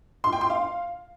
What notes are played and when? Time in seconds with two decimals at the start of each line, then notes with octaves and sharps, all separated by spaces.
0.24 C6
0.33 G5
0.41 C6
0.50 F5